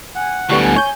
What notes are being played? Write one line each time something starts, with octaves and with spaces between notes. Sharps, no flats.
F#5 G#5
D2 A2 D3 G3 B3 C#6
G#5
C#5 G6